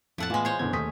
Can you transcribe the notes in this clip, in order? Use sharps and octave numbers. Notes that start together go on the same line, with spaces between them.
F2 A2 A4 F#5 A5 F#6
A2 E3 G#3 B3 F4 G#5
C5 C#5
F#1 B2 D3 E3 G#6
D#2 A3 C#4 D#6 B6